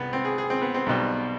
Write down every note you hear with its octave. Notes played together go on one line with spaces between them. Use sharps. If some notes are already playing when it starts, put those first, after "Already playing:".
Already playing: C2 B3
C4
G#4
G#4
C4
B3
C4
B1 B2 G3